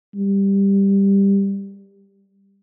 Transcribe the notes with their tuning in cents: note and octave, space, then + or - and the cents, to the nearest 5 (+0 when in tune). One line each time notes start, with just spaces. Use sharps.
G3 +10